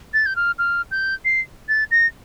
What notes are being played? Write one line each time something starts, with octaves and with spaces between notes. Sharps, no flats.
A6
G6
F6
F6
G6
C7
A6
A#6